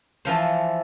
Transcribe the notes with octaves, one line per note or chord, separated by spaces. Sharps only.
E3 F3 C5